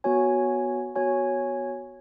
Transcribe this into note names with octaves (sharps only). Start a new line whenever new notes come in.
B3 F#4 C#5 G#5
B3 F#4 C#5 G#5